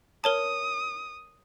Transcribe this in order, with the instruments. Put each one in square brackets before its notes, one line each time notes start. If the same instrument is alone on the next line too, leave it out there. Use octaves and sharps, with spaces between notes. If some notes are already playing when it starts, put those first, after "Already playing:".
[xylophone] A#4 C#5 A5 [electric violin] D#6